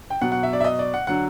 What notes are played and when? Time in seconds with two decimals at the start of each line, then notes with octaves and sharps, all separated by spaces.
0.10 G5
0.22 B2 F#3 F#5
0.32 F#5
0.43 E5
0.53 D5
0.60 E5
0.64 D#5
0.79 D5
0.94 F#5
1.07 D3 F#3 F#5